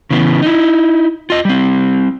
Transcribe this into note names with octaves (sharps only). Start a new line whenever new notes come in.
C#3 E3 B3
D#4 E4
F4 D#5
G3 C4